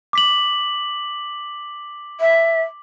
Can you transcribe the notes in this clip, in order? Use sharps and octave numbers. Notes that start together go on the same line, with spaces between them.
D6 B6 F#7
E5